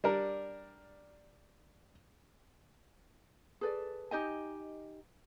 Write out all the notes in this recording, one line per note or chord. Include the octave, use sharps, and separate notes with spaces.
G3 D4 A#4
G#4 A4 B4 D5
D#4 G4 D#5 G#5